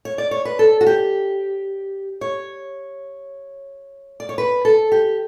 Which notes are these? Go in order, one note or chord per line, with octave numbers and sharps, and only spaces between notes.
C#5
D5
C#5
B4
A4
F#4
G4
C#5
D5
C#5
B4
A4
G4